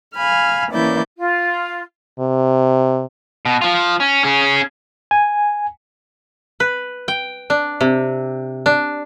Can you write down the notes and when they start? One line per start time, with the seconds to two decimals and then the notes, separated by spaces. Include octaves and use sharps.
0.15 F5 G#5 B5 F6
0.71 E3 A#3 C#4 E4 D5 G6
1.19 F4
2.19 C3
3.45 B2
3.62 F3 F4
4.00 C#4
4.24 C#4 G#4
5.11 G#5
6.60 B4
7.08 G5
7.50 D4
7.81 C3
8.66 D4